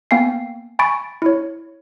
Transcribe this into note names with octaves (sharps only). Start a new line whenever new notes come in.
A#3 B3 F5 G5 G#5 C7
G#5 B5 C#6 A6 D7
E4 C#5